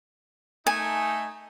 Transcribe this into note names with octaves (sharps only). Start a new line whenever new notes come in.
A3 D#4 G#5